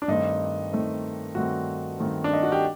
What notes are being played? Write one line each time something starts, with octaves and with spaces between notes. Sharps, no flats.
D4
G2 D#3 A3 C4 D#4
G2 D#3 A3 C4
G2 D#3 A3 C4 F#4
G2 D#3 A3 C4
D4
D#4
F#4
G4